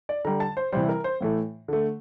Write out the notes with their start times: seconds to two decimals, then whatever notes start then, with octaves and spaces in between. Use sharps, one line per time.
0.09 D5
0.25 D3 G3 A#5
0.40 A5
0.57 C5
0.72 C3 E3 G3 C5
0.89 A#4
1.04 C5
1.21 A2 E3 A3
1.68 D3 A3